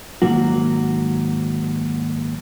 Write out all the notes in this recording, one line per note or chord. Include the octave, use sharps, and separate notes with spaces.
D#2 G#2 F#3 A#3 F#4